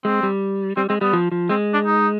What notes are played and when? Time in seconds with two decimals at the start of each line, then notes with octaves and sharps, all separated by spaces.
0.05 G#3 C4
0.23 G3
0.77 G3 C4
0.89 G#3 C4
1.01 G3 B3
1.13 F3
1.32 F3
1.49 G#3 C4
1.74 D4
1.86 D#4